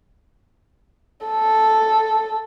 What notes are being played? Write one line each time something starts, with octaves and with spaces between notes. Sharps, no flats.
A4